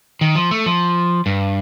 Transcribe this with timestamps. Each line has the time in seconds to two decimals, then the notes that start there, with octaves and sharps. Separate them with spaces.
0.21 D#3
0.36 F3
0.51 A3
0.66 F3
1.26 G2